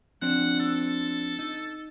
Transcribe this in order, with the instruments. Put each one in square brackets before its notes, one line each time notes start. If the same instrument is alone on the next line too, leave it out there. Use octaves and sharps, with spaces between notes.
[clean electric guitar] F3 C4 D4 [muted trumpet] F#5
[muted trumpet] A4
[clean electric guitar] D#4